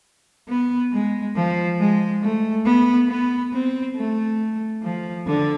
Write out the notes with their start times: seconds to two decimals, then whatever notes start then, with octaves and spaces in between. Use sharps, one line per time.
0.49 B3
0.92 G#3
1.36 F3
1.79 G#3
2.22 A3
2.65 B3
3.09 B3
3.53 C4
3.96 A3
4.83 F3
5.27 D3